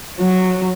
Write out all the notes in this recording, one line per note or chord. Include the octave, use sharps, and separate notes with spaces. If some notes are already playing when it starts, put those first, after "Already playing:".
F#3